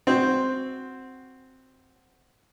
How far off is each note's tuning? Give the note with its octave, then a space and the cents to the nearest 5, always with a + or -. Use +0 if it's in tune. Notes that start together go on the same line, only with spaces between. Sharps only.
C4 +0 F#4 +0